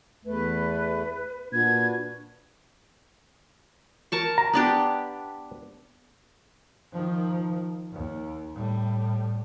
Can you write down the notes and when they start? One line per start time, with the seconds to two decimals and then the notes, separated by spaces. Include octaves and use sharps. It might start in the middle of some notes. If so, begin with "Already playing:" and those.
0.25 E2 A3 B4
1.53 A#2 D4 F#4 B4 G#6
4.12 A#4 A5 C#6
4.38 A#5
4.53 B3 D4 G4
6.93 D#3 F3
7.93 D#2
8.55 A2 G3